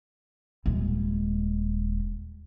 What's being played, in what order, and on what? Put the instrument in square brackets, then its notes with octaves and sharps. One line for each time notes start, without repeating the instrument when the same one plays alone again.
[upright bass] D#1 G#3